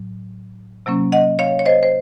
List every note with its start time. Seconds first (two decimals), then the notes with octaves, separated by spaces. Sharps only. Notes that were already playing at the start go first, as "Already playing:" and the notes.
Already playing: A2 F#3
0.86 C3 F#3 A#3 C#4
1.12 D#5 F#5
1.39 C#5 F5
1.59 C#5
1.66 C5 D#5
1.83 C5